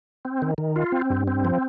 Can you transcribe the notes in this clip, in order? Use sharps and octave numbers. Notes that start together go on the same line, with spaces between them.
C4
D#3
D#3
F4
C4
G2
C4
F3